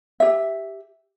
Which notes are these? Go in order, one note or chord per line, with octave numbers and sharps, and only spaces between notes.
G4 E5